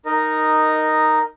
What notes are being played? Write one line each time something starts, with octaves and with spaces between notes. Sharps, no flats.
D#4 A#4 D#5